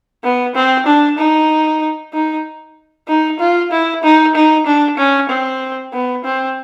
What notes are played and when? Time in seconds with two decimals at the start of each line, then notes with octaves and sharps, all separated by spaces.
0.24 B3
0.55 C4
0.86 D4
1.18 D#4
2.13 D#4
3.08 D#4
3.40 F4
3.72 E4
4.03 D#4
4.35 D#4
4.66 D4
4.98 C#4
5.29 C4
5.93 B3
6.24 C4